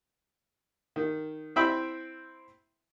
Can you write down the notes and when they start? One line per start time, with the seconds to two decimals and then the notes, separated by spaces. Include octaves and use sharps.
0.96 D#3
1.56 C4 E4 E5 G5 B5